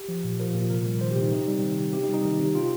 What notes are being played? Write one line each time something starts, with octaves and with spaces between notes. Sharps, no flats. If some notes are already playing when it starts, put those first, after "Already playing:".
Already playing: G4
F3
A#2
F3 A#4
A#2
C3 A#4
G3
D#3 C5
C3 G4
D#4
C3 D#4
G3
D#3
C3
C3 G4
D#4
G3
D#4
D#3
C3
C3 F4